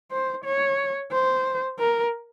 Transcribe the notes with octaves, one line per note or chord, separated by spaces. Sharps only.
C5
C#5
C5
A#4